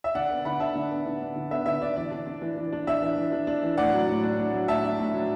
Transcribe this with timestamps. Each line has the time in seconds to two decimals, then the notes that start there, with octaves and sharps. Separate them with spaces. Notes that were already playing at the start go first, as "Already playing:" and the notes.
0.04 E5
0.15 D3 D5 F#5
0.30 B3
0.45 D3 F#5 B5
0.60 D4 E5 A5
0.75 D3
0.91 B3
1.06 D3
1.21 D4
1.36 D3
1.51 B3 E5
1.66 D3 E5
1.81 D4 D5
1.96 E3 D5
2.11 D4
2.27 D4
2.42 E3
2.57 E3
2.73 D4
2.87 D4 E5
3.02 E3
3.17 E3
3.32 D4
3.47 D4
3.63 E3
3.77 A2 D5 F#5
3.93 F#3
4.08 A2
4.24 D4
4.39 A2
4.53 F#3
4.68 A2 E5 A5
4.84 D4
4.99 A2
5.14 F#3